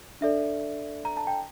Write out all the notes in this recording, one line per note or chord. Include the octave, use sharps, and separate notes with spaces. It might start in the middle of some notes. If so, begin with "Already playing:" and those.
D4 A4 D5 E5
A#5
A5
G5